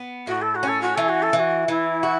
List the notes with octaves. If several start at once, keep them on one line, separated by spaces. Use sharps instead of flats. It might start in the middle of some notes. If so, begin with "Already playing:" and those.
Already playing: B3
A2 F#4
A4
F#4
C#4
A4
F#4
E3 A4
F#4
A4
E3 A4
F#4
E3 E4
F#4